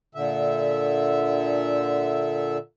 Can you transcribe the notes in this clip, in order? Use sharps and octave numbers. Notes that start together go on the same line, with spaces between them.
A#2 D3 E5